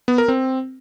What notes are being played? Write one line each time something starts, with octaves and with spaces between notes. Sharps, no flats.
B3
A#4
C4